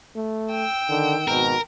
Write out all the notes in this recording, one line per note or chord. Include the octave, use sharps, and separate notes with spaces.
A3
G5 E6
D3 D#3
G#1 B2 A#4